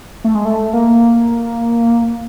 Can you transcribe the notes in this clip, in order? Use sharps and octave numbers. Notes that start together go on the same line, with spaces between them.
A3
G#3
A3
A#3